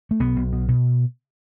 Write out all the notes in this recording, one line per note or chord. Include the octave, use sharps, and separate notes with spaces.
A3
B1 B3
B1
B2
B2